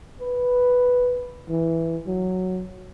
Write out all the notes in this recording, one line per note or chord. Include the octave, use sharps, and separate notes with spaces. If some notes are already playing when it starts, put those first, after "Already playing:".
B4
E3
F#3